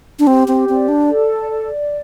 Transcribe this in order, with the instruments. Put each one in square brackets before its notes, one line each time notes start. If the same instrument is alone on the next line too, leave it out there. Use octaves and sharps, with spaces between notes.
[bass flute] D4
[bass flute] C4 [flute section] G4
[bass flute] C4
[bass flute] C4 [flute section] D5
[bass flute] D4
[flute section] A4
D5